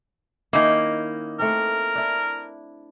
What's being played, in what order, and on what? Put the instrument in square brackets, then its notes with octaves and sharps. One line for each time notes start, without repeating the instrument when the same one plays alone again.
[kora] D#3 C#4 E4 [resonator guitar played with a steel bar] A#3 D#4
[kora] A3 C4 [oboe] A#4
[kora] D4 E4